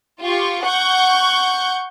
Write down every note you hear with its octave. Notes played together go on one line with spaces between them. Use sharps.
F4 G4 C#6
F#5 C#6 G6